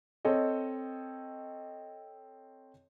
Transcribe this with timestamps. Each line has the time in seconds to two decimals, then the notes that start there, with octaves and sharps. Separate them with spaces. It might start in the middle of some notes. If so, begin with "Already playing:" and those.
0.25 C4 A4 C#5 D#5